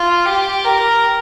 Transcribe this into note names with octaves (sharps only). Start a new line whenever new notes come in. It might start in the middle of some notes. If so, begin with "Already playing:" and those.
Already playing: F4
G4
A#4